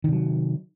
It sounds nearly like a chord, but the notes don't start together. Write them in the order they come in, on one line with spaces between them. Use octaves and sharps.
D#3 C3 F#3